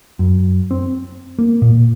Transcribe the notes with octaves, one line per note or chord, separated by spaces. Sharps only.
F#2
C4
A#3
A#2